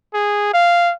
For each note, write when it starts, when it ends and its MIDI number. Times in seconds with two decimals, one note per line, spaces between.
0.14 0.51 68
0.53 0.93 77